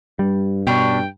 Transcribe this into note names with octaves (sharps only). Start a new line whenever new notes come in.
G2 G3
B2 C#4 D4 G5 B5